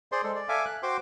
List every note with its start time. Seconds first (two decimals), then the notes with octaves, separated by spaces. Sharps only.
0.12 G#4 C5 D5 C6
0.23 G#3 A4
0.35 D5
0.49 A4 E5 F5 G#5 D6
0.65 F#6
0.83 F#4 C5 G5 C6 D6